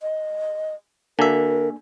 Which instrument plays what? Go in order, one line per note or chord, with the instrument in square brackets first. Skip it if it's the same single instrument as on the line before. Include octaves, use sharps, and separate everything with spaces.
[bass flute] D#5
[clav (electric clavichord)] D3 E5 [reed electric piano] A#3 D4 G#5 [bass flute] F#4 [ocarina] A#4